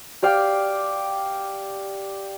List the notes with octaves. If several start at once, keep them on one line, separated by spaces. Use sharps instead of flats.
G4 D5 F5 G5